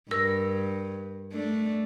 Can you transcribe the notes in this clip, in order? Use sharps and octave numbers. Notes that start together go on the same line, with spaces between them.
G2 A#4 E6 A#6
A3 D4